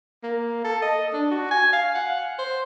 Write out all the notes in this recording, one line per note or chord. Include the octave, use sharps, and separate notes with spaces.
A#3
A4
D#5
D4
F#4
G#5
F5
F#5
C5